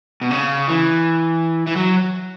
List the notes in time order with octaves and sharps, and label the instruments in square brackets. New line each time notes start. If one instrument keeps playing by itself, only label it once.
[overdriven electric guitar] B2
C#3
E3
E3
F#3